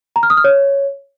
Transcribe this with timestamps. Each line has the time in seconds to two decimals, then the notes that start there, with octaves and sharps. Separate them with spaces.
0.16 A#5
0.23 F6
0.30 D#6
0.37 F6
0.44 C#5